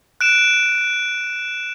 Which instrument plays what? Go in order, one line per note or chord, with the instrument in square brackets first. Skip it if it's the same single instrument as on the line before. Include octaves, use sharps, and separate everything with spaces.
[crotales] F#6 D7 E7